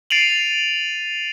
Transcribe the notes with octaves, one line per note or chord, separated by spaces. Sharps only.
A6 C7 D7 D#7 F7 F#7